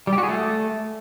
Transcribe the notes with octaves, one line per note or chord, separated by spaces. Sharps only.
G3
G4
F#4
G#4
A3